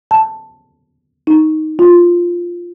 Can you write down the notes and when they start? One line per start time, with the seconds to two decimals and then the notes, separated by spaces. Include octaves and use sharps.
0.11 A5
1.27 D#4
1.79 F4